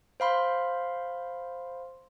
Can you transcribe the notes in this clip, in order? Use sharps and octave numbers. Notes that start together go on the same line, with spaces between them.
C5 F5 B5 C6